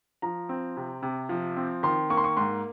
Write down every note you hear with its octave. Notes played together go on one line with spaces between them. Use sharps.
F3 A#5
C4
C3
C3
F3
C4
D#3 C6
A#3 C#6
C6
C#6
G#2 C6